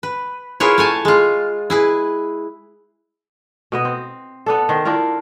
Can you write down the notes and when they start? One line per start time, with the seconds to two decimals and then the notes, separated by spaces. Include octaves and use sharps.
0.03 B4
0.60 E4 F4 G#4 A#4 B4 C#5
0.78 A3 C#5 G#5 A5
1.05 G#3 F4
1.70 E4 G#4 B4
3.72 B2 B3 D#5
3.85 C4
4.46 B3 D4 A4
4.69 D#3 C5
4.85 D4 E4 F4 A#4